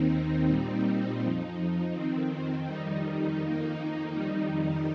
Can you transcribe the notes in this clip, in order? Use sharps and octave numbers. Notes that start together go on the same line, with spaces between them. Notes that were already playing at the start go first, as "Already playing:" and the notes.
Already playing: D#2 D#3 C4 D#4
A#2 G3 C4 D#4
F2 F3 D#4
F2 D#3 C4
F2 D#3 G3 D#4
F2 D#3 A#3 D#4
F2 D#3 G3 D#4